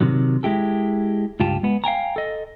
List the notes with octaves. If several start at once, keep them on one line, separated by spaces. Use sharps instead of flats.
C3 D#3 F#3
G#3 E4 G4 A4
C#2 G2 F4 G4 A5
G#3 B3
F5 G5 G#5 A#5
A4 D#5